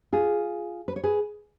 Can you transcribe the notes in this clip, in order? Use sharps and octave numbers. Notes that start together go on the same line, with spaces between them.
F4 G#4
B4
C#5
G#4 B4